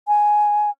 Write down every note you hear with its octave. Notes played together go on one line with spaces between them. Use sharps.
G#5